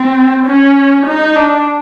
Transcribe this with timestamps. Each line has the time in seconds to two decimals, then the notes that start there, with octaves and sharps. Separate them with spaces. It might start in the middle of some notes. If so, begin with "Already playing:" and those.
Already playing: C4
0.46 C#4
1.06 D#4
1.36 D4